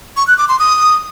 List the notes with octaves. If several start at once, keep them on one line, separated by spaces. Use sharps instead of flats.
C#6
F#6
D6
C6
D#6